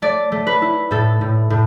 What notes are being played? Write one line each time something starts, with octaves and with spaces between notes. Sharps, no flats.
A3 D5
A3
B4
E4
A2 A4
A2
A2